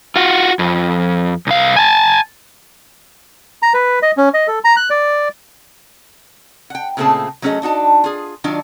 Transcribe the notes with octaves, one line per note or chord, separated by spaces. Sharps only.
F4 F#4
F2
C2 F5
G#5 A5
A#5
B4
D#5
C#4
D#5
A4
A#5
F#6
D5
F#5 G5
A#2 C#3 A3 C4 G#4 A5
F#3 A3 C#4 G4 G#4 D#5
D4 D#4 F#4 A5
F4 G#4
D#3 F#3 D4 F4 D5